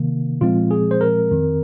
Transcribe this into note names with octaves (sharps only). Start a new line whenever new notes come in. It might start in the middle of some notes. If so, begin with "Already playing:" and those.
Already playing: C3 D#3 A#3
A#2 F3 G#3 C4 F4
G#4
C5
A#4
F2 D#3 C4